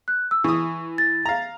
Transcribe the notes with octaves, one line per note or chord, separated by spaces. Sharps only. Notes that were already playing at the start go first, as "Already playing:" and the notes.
F#6
E6
E3 C#6 D#6
A6
F5 A#5